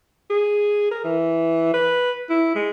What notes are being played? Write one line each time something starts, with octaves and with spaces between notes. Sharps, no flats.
G#4
A#4
E3
B4
E4
G#3